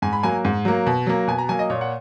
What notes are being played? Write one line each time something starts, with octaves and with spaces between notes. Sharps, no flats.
G#2 G#5
B5
F#3 A#3 G#5
G#2
F#3 A#3
B2
F#3 A#3
B2 G#5
A#5
F#3 A#3 G#5
D#5
A#2 C#5
F#5